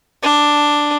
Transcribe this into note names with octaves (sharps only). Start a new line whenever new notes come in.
D4